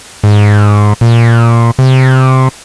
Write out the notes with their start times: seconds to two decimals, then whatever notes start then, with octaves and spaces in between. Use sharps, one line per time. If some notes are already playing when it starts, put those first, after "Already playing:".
0.24 G#2
1.01 A#2
1.79 C3